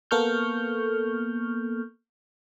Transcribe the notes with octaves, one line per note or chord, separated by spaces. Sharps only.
A#3 B3 A4 C#6 F6 G6